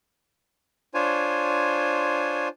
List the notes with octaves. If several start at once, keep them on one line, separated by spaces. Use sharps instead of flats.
D4 F4 C5 C#5 G#5